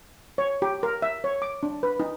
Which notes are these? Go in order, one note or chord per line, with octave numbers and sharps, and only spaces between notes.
C#5
G4
A#4
E5
C#5
D6
D4
B4
D#4